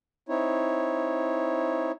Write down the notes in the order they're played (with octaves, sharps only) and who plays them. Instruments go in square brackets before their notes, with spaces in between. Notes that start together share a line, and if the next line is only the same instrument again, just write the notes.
[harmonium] C4 D#4 E4 C#5